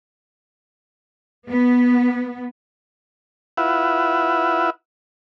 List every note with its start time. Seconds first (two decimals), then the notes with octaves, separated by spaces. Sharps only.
1.49 B3
3.57 E4 F4 B4 E5 F#5